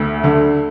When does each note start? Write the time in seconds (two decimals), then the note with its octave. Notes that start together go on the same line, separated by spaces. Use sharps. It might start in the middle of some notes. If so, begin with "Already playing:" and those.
Already playing: D2 E5
0.24 D3